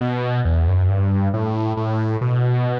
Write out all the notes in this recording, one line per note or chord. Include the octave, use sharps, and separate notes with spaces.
B2
E2
F#2
G2
A2
A2
B2